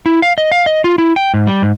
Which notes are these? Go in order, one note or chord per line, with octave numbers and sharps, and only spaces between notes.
E4
F5
D#5
F5
D#5
F4
E4
G5
G#2
G3
G#2